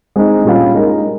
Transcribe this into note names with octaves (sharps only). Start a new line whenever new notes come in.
G#3 C4 D#4
A#2 G3 C#4 F4
G#3 D#4 A#4